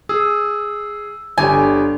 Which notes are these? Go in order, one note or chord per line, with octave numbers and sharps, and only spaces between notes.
G#4 E6
G1 D3 D4 G4 G#5